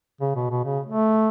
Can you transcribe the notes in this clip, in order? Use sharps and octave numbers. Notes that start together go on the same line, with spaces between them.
C#3
B2
B2
C#3
A3